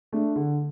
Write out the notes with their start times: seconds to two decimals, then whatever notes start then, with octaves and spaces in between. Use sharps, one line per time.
0.13 A3 D4
0.36 D3